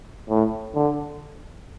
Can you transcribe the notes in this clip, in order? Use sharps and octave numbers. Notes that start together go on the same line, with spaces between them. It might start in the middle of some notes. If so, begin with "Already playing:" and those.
A2
D3